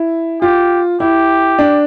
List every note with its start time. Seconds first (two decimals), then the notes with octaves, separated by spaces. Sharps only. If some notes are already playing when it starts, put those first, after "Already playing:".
Already playing: E4
0.42 F4 G4
1.00 E4 G4
1.59 D4